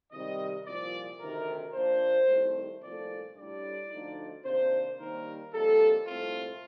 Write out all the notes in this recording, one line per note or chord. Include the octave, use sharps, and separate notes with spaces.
C3 D#3 G3 D#5
C2 A#2 F3 D5
D2 C3 D#3 A#4
A#2 F3 A#3 D4 C5
C2 C3 D#3 A3
C2 A#2 F3 A3 D5
A2 G3 D4 D5
D2 D3 F3 A3 D#4
C3 D#3 A#3 D4 C5
D#2 D#3 G3 A#3 A#4
F2 C3 G3 A#3 D#4 A4
C2 A#2 A3 C4 F4